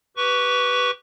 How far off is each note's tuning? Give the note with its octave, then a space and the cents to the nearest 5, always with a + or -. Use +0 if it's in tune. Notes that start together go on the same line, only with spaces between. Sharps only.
G4 +0 B4 +0 C#6 +20